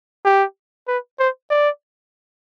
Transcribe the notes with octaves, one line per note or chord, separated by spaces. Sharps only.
G4
B4
C5
D5